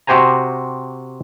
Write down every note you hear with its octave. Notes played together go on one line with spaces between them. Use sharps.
C3 F#4 G4 C5 G#5 A#5